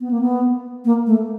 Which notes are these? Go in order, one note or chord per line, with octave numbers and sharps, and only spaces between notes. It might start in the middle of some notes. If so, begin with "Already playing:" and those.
B3
A#3
B3
A#3
A3